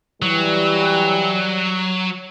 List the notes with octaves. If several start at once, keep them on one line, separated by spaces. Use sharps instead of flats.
E3 F#3 G3